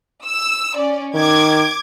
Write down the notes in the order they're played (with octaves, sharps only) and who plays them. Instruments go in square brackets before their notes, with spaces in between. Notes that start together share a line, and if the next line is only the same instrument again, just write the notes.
[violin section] E6
C#4 D5
[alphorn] D#3 [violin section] D6 G#6